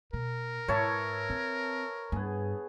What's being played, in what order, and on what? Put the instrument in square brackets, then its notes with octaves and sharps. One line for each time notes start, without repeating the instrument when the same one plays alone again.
[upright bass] B2 [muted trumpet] A#4
[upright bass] G#2 [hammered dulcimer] E4 B4 [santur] C#5 A5
[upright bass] C4
[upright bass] G2 [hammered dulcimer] B3 G#4